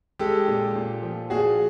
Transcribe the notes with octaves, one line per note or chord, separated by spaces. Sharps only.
G#3 G4 A4
A#2
A#2
F3
A#2 F#4 G#4